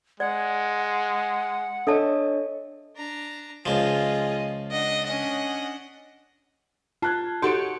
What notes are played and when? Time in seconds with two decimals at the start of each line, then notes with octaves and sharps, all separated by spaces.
0.20 G#3 D5 F#5
1.87 D4 A4 C#5 D#5 E5 A5
2.96 D4 A#5
3.66 C#2 F3 F4 G#4 D#5
4.71 D4 D#5 F#5
5.06 C#4 D#5
7.02 F4 A5 F#6 G#6
7.42 D#4 F#4 G4 A4 C#5 F#5 C6 D7